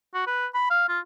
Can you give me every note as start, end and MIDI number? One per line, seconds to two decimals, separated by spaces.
0.14 0.25 66
0.27 0.46 71
0.54 0.70 83
0.70 0.85 77
0.88 0.99 65